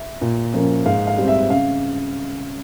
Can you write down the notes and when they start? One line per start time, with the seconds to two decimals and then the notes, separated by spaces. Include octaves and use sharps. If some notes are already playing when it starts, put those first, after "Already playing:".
Already playing: E5
0.21 A#2
0.54 F3 A#3 C#4
0.85 G#2 F5
1.07 F5
1.18 G3 C4
1.28 E5
1.50 C#3 F5